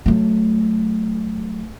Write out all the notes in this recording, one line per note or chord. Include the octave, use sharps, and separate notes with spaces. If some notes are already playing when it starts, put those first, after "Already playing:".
F#3 A3